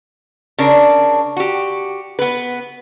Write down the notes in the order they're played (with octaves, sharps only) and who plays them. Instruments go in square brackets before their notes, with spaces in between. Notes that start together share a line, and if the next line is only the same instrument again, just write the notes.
[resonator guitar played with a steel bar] C#3 D4 A#4
F#4 G4
B3 B4